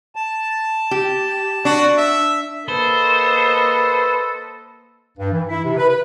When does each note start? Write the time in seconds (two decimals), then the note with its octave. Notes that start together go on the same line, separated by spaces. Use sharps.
0.16 A5
0.91 G4
1.65 D4 F#4
1.98 E5
2.68 A#3 A4 B4 C5 D#5
5.18 G2
5.32 E3
5.49 E4
5.64 C3
5.77 B4
5.89 B4